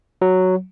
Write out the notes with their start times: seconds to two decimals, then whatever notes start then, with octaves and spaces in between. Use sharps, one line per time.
0.22 F#3